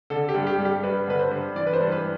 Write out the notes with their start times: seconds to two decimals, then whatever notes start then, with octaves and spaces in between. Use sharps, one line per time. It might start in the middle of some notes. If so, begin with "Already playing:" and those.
0.10 D3 A4
0.29 G4
0.35 G2
0.47 G4
0.59 G3
0.65 G4
0.83 G2 B4
1.07 D3 B4
1.19 C5
1.31 G2
1.56 E3 D5
1.67 B4
1.73 C5
1.81 G2
1.92 B4